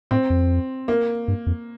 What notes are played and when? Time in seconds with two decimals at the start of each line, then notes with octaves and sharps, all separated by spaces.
0.11 A2 C4
0.30 F2
0.88 A#3
1.28 G2
1.47 F2